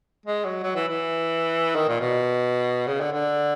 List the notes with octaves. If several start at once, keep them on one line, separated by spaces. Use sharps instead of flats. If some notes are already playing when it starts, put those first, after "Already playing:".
G#3
F#3
F#3
E3
E3
D#3
A#2
B2
C#3
D3
D3